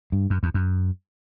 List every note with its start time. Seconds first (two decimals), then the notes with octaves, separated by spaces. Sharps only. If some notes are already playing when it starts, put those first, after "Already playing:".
0.12 G2
0.30 F#2
0.43 E2
0.54 F#2